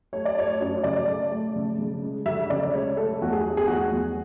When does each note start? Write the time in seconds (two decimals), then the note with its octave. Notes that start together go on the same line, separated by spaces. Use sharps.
0.13 A3 C#5
0.25 D5
0.37 A3 C#5
0.60 F#2
0.84 C#3 D5
1.08 A3
1.31 A3
1.56 C#3
1.78 C#3
2.03 G#3
2.26 D2 E5
2.50 C#3 D5
2.73 G#3 C#5
2.97 A3 A4
3.21 E2 F#4
3.33 G#4
3.44 A3
3.57 G#4
3.68 E2 F#4
3.92 E2